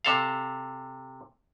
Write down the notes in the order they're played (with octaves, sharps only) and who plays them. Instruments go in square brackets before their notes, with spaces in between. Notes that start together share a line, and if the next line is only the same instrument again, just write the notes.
[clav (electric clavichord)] C3 A4 F5